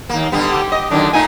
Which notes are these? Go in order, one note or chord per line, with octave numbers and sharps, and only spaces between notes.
D#2 A#3
D3 G3 B3
G4
D#5
F#2 D3 D#3 D4
A#2 A3 D#4 G#5